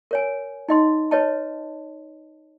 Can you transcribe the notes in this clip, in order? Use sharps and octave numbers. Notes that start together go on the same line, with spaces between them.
A#4 C#5 G#5
D#4 D#5 C6
B4 C#5 D#5 A5